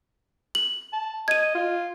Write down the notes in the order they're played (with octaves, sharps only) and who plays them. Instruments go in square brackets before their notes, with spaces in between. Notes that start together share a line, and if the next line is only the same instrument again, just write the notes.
[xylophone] F#7
[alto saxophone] A5
[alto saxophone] D#5 [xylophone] G#6 D#7
[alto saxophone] F4